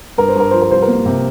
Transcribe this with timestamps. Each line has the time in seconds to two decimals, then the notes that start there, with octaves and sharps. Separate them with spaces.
0.18 G2 A#4
0.29 C5
0.36 G2 A#4
0.51 F3 C5
0.62 A#4
0.70 C2 C5
0.82 A#4
0.88 A#3
1.06 C3